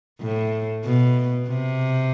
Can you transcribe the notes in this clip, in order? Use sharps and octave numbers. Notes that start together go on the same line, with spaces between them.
A2
B2
C3